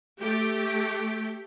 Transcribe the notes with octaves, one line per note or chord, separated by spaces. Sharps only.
A3 G4